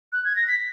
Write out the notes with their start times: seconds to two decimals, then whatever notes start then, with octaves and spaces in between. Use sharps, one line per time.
0.13 F#6
0.25 G#6
0.36 A#6
0.48 B6